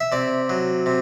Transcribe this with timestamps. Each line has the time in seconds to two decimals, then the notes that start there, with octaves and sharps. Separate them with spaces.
0.01 E5
0.12 C3 D5
0.49 F#3
0.86 C3